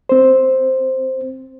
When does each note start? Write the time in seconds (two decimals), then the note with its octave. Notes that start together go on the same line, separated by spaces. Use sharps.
0.09 C4 C5